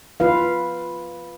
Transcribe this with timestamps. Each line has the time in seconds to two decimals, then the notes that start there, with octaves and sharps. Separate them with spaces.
0.20 F4 B4 F5